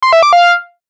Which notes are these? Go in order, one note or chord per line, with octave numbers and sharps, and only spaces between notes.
C6
E5
D6
F5